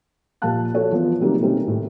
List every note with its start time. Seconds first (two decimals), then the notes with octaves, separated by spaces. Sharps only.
0.42 A#2 F3 G4 F5 A5 F#6
0.75 F#4 A4 C#5
0.91 E3 F3 B3
1.21 C3 D#3 F#3 G3 A3 A#3
1.40 B2 D#3 G3 A3 C4 C#4
1.68 A2